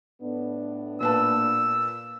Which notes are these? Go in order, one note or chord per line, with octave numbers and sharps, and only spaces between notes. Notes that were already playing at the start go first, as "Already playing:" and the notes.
A2 B3 D4
A#2 B4 A5 E6